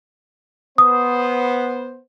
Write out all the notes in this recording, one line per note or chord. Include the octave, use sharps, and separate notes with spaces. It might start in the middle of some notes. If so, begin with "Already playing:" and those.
B3 C5 D#6